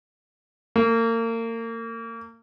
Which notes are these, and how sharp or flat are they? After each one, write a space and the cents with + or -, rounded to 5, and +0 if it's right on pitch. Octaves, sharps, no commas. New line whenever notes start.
A#3 -35